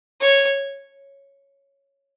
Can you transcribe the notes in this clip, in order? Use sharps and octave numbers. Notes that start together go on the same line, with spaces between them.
C#5